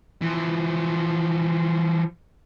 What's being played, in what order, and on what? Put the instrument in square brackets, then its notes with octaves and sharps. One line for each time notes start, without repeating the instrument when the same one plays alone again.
[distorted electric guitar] E3 F3